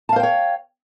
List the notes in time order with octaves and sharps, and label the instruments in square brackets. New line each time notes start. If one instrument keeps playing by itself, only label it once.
[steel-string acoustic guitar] A5
F5
C5
G5
C#5